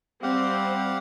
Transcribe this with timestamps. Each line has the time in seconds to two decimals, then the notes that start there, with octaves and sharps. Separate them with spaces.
0.23 G3 C4 G4 F5 F#5